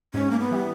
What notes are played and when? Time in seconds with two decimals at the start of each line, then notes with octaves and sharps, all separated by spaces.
0.14 G#2 C#4
0.31 A#3
0.39 B3
0.51 E3 G3